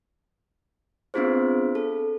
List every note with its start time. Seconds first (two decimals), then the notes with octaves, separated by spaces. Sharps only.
1.14 B3 C4 D4 F4 G#4 C5
1.75 A4